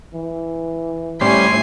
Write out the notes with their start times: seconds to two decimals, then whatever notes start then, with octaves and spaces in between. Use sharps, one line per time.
0.15 E3
1.21 A2 G3 C#4 C5 G#5 C7